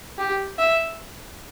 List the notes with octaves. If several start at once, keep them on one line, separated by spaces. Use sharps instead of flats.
G4
E5